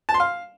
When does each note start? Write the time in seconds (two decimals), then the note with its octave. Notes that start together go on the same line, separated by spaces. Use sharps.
0.09 A5
0.14 C6
0.20 F5